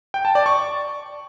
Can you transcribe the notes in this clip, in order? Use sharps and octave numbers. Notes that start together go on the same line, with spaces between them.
G5
A5
D5
C#6